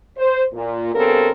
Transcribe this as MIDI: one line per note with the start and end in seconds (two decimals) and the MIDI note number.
0.17 0.43 72
0.54 0.90 46
0.94 1.30 43
0.94 1.30 49
0.94 1.30 59
0.94 1.30 60
0.94 1.30 69
0.94 1.30 70